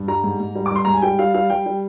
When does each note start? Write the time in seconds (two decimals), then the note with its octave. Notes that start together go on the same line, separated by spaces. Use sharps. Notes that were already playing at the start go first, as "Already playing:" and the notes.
Already playing: G2
0.08 G3 A#5
0.24 G#2
0.40 G#2
0.55 G3
0.66 D6
0.71 G3 C6
0.85 G#2 A#5
0.93 G#5
1.02 G3 G5
1.19 G3 F5
1.34 G3 F5
1.50 G3 G5
1.66 G3